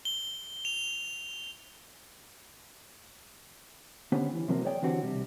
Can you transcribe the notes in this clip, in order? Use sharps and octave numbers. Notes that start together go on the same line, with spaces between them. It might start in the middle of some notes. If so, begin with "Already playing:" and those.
G7
F7
D3 B3 C#4 G4 C5
E3
C3 F3 F#3 A#3 C4
G#4 C#5 D5 G5
D3 E3 C4 F#4 G4 C5
B1 C3 G3